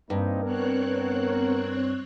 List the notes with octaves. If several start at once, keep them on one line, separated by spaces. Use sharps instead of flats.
G2 A#3 C4 D#4
B3 C4 A#4 C#5 F#6